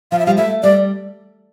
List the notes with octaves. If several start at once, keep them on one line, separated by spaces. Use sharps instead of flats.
F3 F5
E5
G3 F5
A3 E5
G3 D5